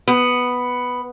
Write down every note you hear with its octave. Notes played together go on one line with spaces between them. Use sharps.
B3